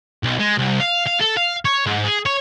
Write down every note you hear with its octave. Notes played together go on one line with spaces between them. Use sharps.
B1
G#3
C2
F5
F5
A4
F5
C#5
G#2
G#4
C#5